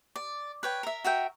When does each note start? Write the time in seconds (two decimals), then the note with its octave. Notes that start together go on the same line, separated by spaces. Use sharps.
0.16 D5
0.63 B4 C#5 G5
0.83 A#4 E5
1.04 F#4 A#4 E5 G5